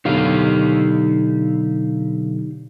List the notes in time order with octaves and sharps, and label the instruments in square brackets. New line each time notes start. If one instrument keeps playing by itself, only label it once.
[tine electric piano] B2 D3 F#3 [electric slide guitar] D#4 G4 F5